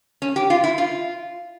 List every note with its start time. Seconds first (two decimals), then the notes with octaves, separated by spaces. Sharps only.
0.22 C#4
0.36 G4
0.50 F4
0.64 E4
0.78 F4